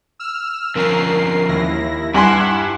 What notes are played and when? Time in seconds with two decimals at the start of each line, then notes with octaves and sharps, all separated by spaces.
0.19 E6 F6
0.75 D3 F3 C#4 A#4 C7
1.48 D#2 E4 A#6
2.14 G2 E4 F#5 G#5 C6